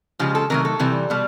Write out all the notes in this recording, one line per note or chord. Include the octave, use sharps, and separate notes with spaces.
C#3 F3 G#3 G4
A4
C3 D#3 F#3 A3 A#4
A4
C3 E3 G3
B2 G3